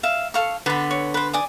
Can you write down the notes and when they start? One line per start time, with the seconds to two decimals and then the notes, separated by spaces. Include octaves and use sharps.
0.03 E5 F5
0.34 A4 F5 C#6
0.66 D3 B3 B4 B5
0.91 C#5
1.14 B4 C5
1.33 D5 G#5 D#6